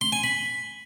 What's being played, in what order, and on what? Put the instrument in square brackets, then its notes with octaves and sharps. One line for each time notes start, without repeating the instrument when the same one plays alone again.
[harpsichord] C6
G#5
B5